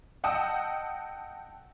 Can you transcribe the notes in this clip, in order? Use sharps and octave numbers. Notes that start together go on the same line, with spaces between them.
D#5 F#5 G5 A5 D#6 E6